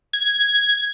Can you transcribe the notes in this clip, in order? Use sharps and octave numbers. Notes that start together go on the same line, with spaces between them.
G#6